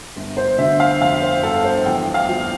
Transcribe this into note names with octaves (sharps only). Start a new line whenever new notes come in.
G1
C5
D3 E5
F5
F2 F5
C5
G1 A4
C5
E2 G5
F5
F3